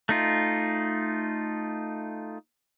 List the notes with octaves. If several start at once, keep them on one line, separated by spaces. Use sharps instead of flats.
A3 D#4 F4